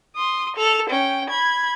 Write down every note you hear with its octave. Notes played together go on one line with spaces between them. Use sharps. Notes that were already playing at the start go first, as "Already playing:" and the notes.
C6 D#6
A4 F7
C#4 G5
B5 G#6